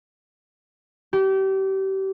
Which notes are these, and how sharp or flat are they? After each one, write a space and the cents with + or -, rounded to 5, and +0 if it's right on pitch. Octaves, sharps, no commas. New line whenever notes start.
G4 -30